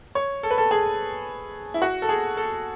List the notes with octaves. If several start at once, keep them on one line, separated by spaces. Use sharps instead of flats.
C#5
A4
B4
A4
G#4
E4
F#4
A4
G#4
A4